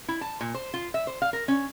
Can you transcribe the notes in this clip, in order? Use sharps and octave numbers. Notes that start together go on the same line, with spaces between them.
E4
A5
A#2
C5
F4
E5
C5
F5
A#4
C#4